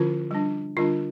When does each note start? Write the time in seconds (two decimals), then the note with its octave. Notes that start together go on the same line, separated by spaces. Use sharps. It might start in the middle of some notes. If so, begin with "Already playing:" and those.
Already playing: D3 F3 C#4 E4 F4
0.31 G3 D4
0.76 D3 G3 D4 F4